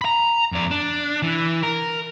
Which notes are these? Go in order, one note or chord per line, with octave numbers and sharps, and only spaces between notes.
A#5 B5
F2 D5
D4
E3
A#4